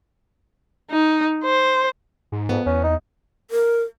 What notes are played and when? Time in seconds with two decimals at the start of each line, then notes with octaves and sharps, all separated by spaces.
0.91 D#4
1.44 C5
2.32 G#2
2.49 F2 B3
2.66 E2 C#4
2.84 D#4
3.51 A#4